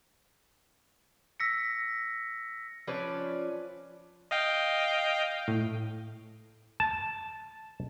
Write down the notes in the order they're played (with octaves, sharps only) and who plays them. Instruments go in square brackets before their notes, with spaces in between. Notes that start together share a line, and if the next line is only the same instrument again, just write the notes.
[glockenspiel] E6 A#6 B6 C#7
[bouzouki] F3 C#4 B4 D5
[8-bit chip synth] D#5 F5 G5
[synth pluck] A2
[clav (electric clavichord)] A5